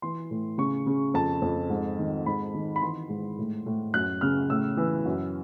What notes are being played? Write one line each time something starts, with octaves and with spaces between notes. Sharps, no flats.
E3 C6
A2
C#3 C#6
C#3
F2 A5
F2
G#2
D#3
G#2 B5
D#3
B5
E3 C6
G#2
A2
A2
F#2 F#6
C#3 F6
A2 E6
E3
F#2